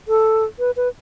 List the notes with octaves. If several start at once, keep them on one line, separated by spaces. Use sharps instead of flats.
A4
B4
B4